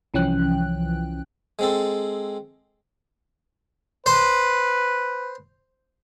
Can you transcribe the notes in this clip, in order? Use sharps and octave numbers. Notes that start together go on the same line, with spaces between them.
C2 E3 F3 C#4 G5 F#6
G#3 C4 A4
B4 C5